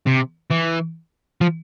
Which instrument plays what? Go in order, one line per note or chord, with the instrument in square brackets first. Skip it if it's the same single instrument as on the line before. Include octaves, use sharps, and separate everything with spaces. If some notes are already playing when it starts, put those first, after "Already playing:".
[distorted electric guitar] C3
E3
F3